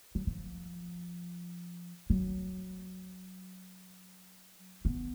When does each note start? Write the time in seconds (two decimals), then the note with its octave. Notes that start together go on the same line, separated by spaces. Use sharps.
0.15 F#3
0.27 F3
2.10 F#3
4.85 B3